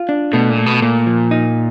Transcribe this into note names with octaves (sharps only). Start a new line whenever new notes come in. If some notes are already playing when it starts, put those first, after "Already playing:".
Already playing: F4
D4
B2 A3
A#2
A3
B2
A#2 A#3
F3
D#4